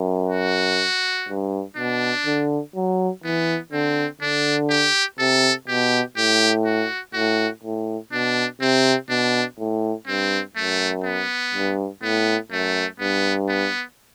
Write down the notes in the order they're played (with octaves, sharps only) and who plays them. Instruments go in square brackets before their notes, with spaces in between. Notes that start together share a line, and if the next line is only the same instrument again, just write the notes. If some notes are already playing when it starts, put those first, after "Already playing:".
Already playing: [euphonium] F#2
[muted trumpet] F#4
[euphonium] G2
[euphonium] B2 [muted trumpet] D4
[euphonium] D3
F#3
[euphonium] E3 [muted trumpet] B3
[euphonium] D3 [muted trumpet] C4
[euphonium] D3 [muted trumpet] D4
[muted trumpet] G4
[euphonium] C3 [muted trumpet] A4
[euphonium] B2 [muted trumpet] G4
[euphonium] A2 [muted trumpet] G4
[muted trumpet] F#4
[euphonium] A2 [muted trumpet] F#4
[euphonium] A2
[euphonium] B2 [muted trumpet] D4
[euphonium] C3 [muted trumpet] C4
[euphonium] B2 [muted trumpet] D4
[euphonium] A2
[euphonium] G2 [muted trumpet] C4
[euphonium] F#2 [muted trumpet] A3
[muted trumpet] B3
[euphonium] G2
[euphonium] A2 [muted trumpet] B3
[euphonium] F#2 [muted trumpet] A3
[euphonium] G2 [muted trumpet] B3
[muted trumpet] B3